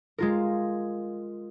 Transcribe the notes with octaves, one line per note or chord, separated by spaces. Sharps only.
G#3 F4 A#4